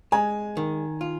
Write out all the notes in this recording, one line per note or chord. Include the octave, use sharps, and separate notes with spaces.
G#3 G#5
D#3
F4